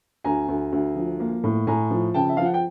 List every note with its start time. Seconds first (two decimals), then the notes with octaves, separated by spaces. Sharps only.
0.24 D2 G#5 A#5
0.49 D2
0.73 D2
0.96 F3
1.20 A#3
1.44 A2
1.67 A2 G#5 A#5
1.90 F3
2.14 C#3 G5 A5
2.29 E5
2.37 F3 F5
2.45 F#5
2.54 G5